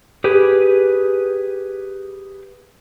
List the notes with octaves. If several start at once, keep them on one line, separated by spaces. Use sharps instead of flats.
G4 G#4 B4